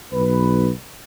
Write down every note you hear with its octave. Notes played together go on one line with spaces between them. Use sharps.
B1 B4